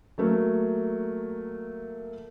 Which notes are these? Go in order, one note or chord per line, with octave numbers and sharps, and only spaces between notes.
F#3 A3 A#3